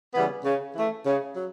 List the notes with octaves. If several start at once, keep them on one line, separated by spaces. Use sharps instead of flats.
C#3 E3 G3 B3
C#3
E3 A3
C#3
F#3